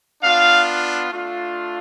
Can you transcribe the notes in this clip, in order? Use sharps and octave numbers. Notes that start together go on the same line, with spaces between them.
B3 D4 F4 F5
A3 D4 F4